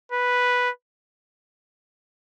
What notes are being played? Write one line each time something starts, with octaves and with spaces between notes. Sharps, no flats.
B4